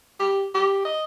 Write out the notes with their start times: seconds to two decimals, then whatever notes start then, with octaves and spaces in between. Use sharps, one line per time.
0.20 G4
0.55 G4
0.85 D#5